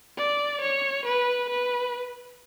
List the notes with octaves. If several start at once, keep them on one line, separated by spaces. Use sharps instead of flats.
D5
C#5
B4
B4